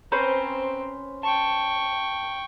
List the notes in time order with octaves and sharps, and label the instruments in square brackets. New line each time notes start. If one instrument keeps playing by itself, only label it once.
[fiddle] C4 [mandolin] C#4 B4 C5 [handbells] A#5 C7
[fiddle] G5 C#6 [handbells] A5